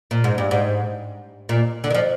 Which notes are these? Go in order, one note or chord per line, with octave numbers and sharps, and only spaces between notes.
A#2
G#2
G2
G#2
A#2
D3
D#3
F3